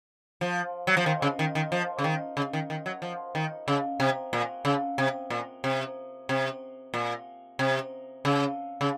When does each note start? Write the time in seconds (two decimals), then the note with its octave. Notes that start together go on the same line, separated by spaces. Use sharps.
0.41 F3
0.87 F#3
0.97 F3
1.06 D#3
1.22 C#3
1.39 D#3
1.55 D#3
1.72 F3
1.99 C#3
2.04 D#3
2.37 C#3
2.53 D#3
2.70 D#3
2.86 F#3
3.02 F3
3.35 D#3
3.68 C#3
4.00 C3
4.33 A#2
4.65 C#3
4.98 C3
5.30 A#2
5.64 C3
6.29 C3
6.94 A#2
7.59 C3
8.25 C#3
8.81 C#3